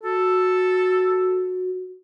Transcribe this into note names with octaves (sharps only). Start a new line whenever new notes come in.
F#4 A4